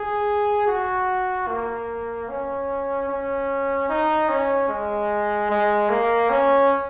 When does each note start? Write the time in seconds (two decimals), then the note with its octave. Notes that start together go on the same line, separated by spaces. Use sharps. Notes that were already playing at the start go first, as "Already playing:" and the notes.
Already playing: G#4
0.67 F#4
1.48 A#3
2.29 C#4
3.08 C#4
3.89 D#4
4.29 C#4
4.69 G#3
5.50 G#3
5.90 A#3
6.30 C#4